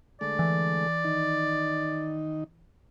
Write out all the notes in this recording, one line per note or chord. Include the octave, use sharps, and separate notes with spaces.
D3 G#3 A3 D5
E3
D#3 D#4